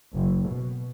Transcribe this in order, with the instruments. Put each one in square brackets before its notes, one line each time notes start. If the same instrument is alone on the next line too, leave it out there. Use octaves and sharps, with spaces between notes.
[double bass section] F#1
B2